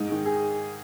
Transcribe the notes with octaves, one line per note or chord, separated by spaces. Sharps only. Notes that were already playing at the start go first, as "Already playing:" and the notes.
Already playing: G#2 D#4
D#3 G#3
G#4